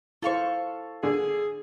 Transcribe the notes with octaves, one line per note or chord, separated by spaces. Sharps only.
E4 A4 C5 F5 C#6
D3 G#4